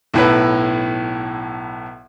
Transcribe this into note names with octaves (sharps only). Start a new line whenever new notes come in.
B1 A2 B4